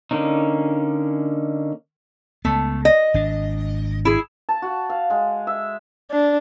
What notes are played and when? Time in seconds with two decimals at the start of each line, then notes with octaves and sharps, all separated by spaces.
0.11 D3 A#3 C#4 D#4
2.45 C#2 A3 B3
2.85 D#5
3.14 G#1 D4
4.05 E4 G#4
4.49 A5
4.62 F#4
4.90 F5
5.10 G#3
5.47 E5
6.11 D4